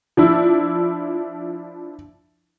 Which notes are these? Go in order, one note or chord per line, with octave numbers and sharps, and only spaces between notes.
F3 D4 E4